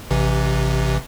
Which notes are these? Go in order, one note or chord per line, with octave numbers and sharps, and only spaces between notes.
A1 C3 E3